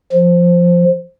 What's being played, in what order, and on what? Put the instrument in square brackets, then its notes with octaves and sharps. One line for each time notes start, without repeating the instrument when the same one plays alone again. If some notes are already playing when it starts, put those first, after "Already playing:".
[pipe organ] F3